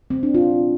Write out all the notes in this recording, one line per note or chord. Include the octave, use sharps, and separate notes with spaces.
C4
D4
A#2 F4